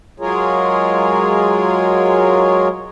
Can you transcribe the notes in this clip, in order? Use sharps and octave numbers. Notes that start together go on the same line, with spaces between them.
F#3 G#3 F4 G#4 A#4 C#5